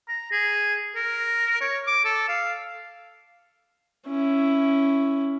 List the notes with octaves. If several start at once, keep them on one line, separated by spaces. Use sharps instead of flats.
A#5
G#4
A#4
C#5
D6
A4
F5
C#4 E4